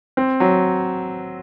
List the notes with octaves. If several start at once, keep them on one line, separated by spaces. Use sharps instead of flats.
C4
F#3